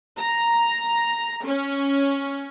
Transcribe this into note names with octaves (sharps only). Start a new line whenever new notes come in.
A#5
C#4